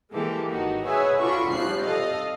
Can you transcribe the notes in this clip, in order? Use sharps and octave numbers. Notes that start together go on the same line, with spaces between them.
E3 G#3 A#3 G4 A4
G#1 D#4 F#4
G#4 B4 C#5 E5 F#5 G#5
D4 F4 F#4 A4 B5 C#6
G#1 C3 F3 G3 F#6 C7
A4 D#5 F5